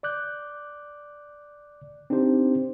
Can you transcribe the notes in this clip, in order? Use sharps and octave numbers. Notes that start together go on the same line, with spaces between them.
D5 D6 F#6 G6
C4 D4 D#4 G4 C5